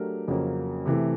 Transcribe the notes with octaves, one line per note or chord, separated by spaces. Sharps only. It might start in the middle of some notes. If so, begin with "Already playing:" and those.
Already playing: F#3 A3 D4 G4 A#4
F2 C#3 F#3 A#3 C#4
C3 E3 A3